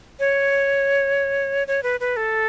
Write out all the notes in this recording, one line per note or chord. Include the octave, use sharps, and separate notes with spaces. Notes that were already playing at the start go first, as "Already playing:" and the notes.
C#5
C#5
B4
B4
A4